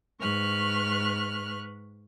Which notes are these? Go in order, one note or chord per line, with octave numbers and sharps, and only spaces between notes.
G#2 B4 C#6 F6 F#6